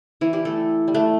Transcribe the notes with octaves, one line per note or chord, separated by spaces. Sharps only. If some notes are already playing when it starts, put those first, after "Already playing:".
E3 E4
G3 G4
A3 A4
G3
A3